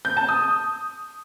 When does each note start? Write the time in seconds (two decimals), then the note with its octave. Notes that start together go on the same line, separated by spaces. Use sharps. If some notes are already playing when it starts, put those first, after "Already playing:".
0.05 G6
0.17 A5
0.29 D#6